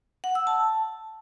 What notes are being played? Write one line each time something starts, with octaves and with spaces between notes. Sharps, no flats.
F#5
E6
A5